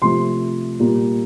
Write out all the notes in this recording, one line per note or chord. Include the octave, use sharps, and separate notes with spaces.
C3 F3 A3 C6
A#2 G3 A#3